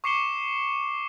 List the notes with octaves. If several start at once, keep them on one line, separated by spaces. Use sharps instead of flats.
C#6 D6 C7 C#7 E7 G7